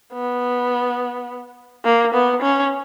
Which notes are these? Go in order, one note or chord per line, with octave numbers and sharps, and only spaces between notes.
B3
A#3
B3
C#4